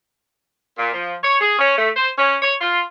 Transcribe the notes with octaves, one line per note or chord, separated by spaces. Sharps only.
A#2
F3
C#5
G#4
C#4
A3
C5
C#4
C#5
F4